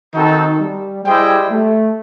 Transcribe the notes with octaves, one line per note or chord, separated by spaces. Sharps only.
D#3 C4 D#4 F#4 A4
G3
G3 E4 G#4 C5 D#5 G5
A3